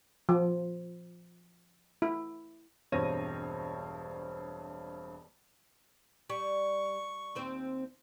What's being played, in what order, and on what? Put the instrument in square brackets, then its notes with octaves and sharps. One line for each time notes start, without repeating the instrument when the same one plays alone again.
[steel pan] F3
E4
[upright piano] E1 G2 C4 C#5 A#6 D#7
[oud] G3 [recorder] C#6
[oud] D#2 C4 C5